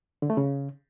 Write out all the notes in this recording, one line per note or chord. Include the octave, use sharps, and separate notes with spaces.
D3
A3
C#3